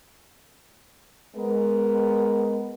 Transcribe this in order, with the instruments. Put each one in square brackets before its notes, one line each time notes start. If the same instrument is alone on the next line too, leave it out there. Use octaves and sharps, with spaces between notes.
[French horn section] G#3 B3 A#4